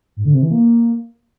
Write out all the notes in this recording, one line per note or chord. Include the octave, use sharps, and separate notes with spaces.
G#2
D3
C3
E3
A#3